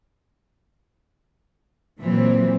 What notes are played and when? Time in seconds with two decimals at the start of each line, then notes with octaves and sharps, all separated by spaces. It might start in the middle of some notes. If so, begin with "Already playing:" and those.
1.99 A#2 E3 F#3 C4